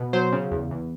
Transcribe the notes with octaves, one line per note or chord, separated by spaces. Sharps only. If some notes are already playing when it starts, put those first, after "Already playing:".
Already playing: B2
F#3 C5
C#3
E2
E2